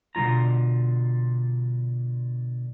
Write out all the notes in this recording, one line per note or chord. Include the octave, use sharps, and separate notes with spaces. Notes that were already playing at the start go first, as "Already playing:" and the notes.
B2 D3 G3 F4 A#5